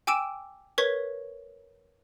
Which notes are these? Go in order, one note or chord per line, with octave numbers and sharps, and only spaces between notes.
G5 G#5 D6 E6 D7 E7
A#4 B4 C#5 C#6 G#6 B6